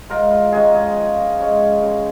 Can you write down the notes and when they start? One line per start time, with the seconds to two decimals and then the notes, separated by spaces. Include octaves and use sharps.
0.10 G#2 F4 A#4
0.31 F4
0.52 D#3 G#3 C#4 G#4
0.75 G#4
0.96 F3
1.40 G#3 C#4
1.82 C#3